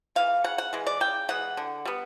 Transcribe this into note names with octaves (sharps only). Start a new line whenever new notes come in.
E3 G#3 F5
C#3 F#5
F#5
E3 G#3
D5
C#3 G5
E3 G#3 F#5
D3
G3 B3